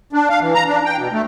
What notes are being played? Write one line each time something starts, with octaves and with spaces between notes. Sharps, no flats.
D4
F5
E3
A#5
D4
G5
B2
A3